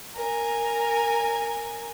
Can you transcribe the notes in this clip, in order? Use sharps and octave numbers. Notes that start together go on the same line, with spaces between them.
A#4 G#5